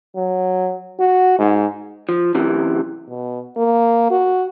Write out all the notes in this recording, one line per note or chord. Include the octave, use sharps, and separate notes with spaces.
F#3
F#4
G#2
F3
F#2 C3 E3
B2
A#3
F#4